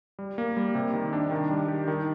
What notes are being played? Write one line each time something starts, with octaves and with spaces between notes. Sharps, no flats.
G3
A#3
G3
C3
D#3
D4
D#3
G3
G4
D#3